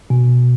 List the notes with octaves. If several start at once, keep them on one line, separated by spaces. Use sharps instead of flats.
B2